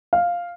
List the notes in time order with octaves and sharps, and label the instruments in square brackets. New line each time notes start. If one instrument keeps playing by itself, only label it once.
[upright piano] F5